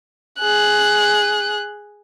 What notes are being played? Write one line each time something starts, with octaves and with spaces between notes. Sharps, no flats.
G#4 F#6